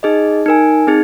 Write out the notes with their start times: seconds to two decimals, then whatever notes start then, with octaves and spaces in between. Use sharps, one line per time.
0.03 D#4 G#4 D#5
0.46 D#4 A#4 G#5
0.87 C4 D#4 G#4